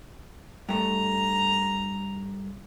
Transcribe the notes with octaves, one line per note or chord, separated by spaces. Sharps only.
G2 A3 A#5